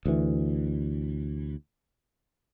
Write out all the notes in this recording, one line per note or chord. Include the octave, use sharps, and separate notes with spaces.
D2 E3